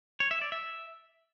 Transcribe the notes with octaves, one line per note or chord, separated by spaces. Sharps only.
C#5
E5
D5
E5